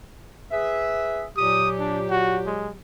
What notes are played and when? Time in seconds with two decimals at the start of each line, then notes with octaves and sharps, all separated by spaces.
0.52 G#4 B4 E5
1.37 A#2 F#3 G4 D#6
1.79 D4
2.10 F#4
2.47 G#3